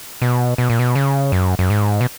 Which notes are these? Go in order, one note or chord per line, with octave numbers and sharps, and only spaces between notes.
B2
B2
A#2
B2
C#3
F#2
F#2
G#2
B2